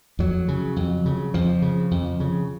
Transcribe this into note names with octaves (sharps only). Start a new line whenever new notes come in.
F2 F#3
C#3
F2
C#3
F2 F3
C#3
F2
C#3